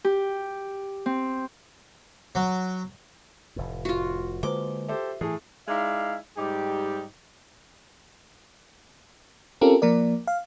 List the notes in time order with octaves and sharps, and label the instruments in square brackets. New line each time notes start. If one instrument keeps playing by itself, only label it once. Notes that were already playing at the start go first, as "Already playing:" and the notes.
[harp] G4
C4
[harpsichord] F#3
[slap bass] F1 A2
[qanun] F4 F#4
[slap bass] D3 G#3 A#3 [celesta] B4 C5 G7 [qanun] D6
[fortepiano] G4 A4 C5 [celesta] E5
[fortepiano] A2 G#4 [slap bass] E3
[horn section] G#3 D#4 E4 D5 F5
G#2 G3 D#4 G4
[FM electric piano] C4 C#4 F4 G4 A4 A#4
F3 A#3 A#4 D5
F5